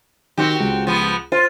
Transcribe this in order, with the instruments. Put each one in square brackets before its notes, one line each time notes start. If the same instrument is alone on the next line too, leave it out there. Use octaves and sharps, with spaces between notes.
[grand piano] D#3 [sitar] C4 F#4 G4
[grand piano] C#2
[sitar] F3 B3
[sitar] F4 [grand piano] C5